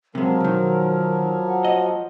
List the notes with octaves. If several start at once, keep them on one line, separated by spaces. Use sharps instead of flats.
C3 F3 F#3 G#3 A#4
B2 D#3
F#5
D#5